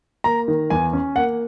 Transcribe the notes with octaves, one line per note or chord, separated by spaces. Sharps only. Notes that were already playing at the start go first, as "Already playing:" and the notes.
A#3 A#5
D#3
E2 G#5
C#4
A#3 F#5